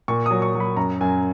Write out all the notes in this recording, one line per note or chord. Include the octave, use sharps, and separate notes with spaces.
A#2 C#6
F#3 D#6
C#6
F#3
B5
F#2 A#5
F#2 G#5